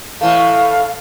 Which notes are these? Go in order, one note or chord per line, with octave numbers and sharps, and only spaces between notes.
A2 E3 A3 F5